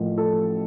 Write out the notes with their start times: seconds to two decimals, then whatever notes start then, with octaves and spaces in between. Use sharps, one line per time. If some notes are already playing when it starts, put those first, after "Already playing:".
Already playing: A1 A2 F3 A#3
0.18 A4